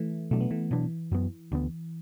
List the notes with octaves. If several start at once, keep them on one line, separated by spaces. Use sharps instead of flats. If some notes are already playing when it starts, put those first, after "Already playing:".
Already playing: E3 A3
B2 F#3 A3 D4
B3
E3 A3
B2 E3 F#3 B3 D4
F#2 F#3 B3
D2 D3 B3